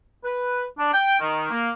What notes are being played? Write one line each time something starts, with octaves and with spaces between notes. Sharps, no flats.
B4
D4
G5
D#3
A#3